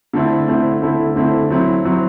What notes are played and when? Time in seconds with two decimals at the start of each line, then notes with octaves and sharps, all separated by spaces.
0.13 D3 A3 C4 E4
0.48 D3 A3 C4 E4
0.82 D3 A3 C4 E4
1.16 D3 A3 C4 E4
1.50 F#3 C4 E4
1.85 F#3 C4 E4